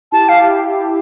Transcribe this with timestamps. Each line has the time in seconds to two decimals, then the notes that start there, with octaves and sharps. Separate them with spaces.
0.12 E4 G4 A5
0.29 F5